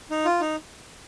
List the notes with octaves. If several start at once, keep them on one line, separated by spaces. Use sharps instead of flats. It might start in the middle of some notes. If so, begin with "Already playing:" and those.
D#4
F4
D#4